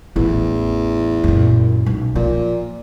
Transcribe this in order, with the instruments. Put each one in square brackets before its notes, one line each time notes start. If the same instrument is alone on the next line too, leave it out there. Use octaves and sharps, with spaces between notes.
[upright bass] A1 [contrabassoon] E2
[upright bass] F#2 A#2
B1
[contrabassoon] A#2 [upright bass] F3